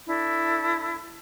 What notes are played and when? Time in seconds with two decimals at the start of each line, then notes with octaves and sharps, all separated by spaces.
0.07 D4 E4 A4